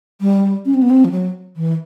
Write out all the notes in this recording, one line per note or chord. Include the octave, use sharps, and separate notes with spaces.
G3
C#4
C4
B3
C4
F3
F#3
E3